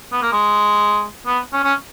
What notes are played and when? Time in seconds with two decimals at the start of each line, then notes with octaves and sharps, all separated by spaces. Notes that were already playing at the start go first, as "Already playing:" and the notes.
0.12 B3
0.22 A#3
0.33 G#3
1.27 B3
1.53 C#4
1.64 C#4